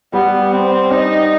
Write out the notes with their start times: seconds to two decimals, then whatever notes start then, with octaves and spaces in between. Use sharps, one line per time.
0.13 G3 B3
0.52 C4
0.91 D#4